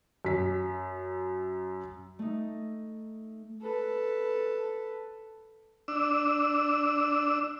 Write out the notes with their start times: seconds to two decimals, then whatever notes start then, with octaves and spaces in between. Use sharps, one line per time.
0.25 F#2 B6
2.19 A3 D#4
3.61 A4 B4
5.88 D4 E6